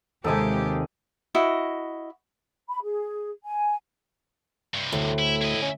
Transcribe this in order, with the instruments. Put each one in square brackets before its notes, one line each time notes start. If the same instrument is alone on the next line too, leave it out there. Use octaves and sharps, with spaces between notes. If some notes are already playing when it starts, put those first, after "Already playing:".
[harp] D#2 C3 [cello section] G#3 G4 [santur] A4 D#5 G#5
[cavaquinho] E4 F#4 D#5
[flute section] B5
G#4
G#5
[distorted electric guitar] G2 C3
[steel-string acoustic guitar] D2 [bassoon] A2
[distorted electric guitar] E4
E4 D#5
[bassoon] C#4